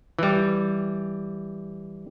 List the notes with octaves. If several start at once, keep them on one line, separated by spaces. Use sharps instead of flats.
E3 G3